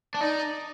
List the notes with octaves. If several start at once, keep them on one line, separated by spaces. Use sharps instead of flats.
D4
D#4 D5